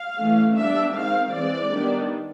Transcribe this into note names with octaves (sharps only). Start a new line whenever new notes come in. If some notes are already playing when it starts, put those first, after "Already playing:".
Already playing: F5
E3 A3 C#4
G3 B3 D4 E5
D#3 G#3 C4 F5
E3 G#3 C4 D5
D#3 G3 B3 D4